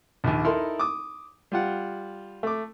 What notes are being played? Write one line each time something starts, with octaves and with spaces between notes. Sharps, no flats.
A#1 D#2
D#4 E4 A4 A#4 C6
D6 D#6
G3 F4 F#5
A3 D6